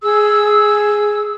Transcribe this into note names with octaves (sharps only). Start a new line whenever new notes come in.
G#4 E6